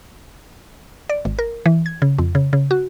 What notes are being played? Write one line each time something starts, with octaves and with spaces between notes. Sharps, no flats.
D5
G#1
A#4
E3
G#6
C#3
F2
C#3
C#3
F#4